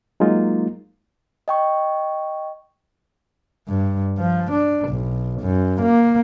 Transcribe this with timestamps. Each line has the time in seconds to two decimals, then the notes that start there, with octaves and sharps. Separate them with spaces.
0.20 F#3 G#3 A#3 D#4 F4
1.48 D#5 G5 C#6
3.68 G2
4.19 F3
4.51 D4
4.89 B1
5.42 F#2
5.82 A#3